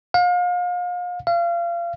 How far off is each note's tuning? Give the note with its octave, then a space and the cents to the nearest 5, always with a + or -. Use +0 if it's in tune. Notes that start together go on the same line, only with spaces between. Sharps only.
F5 +35
F5 -30